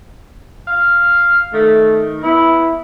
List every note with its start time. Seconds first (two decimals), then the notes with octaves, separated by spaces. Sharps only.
0.67 F5
1.53 D#3 A3
2.23 B3 E4